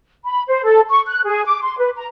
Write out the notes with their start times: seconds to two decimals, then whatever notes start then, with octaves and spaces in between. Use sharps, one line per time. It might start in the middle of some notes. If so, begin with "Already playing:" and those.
0.25 B5
0.47 C5
0.64 A4
0.89 C#6
1.07 F#6
1.26 G#4
1.45 D6
1.62 C6
1.78 B4
1.96 A#5